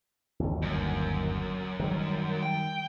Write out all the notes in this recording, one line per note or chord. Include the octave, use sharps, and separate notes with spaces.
G1 D#2
F#2
D#3 G3
G5